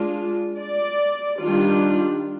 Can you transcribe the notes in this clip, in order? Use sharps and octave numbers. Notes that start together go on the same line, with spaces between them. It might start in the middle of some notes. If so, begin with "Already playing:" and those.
Already playing: G#3 D4 F4
D5
D#3 G3 D4 F4